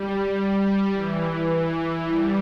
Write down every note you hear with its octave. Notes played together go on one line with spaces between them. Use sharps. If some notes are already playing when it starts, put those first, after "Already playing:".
Already playing: G3
E3
G3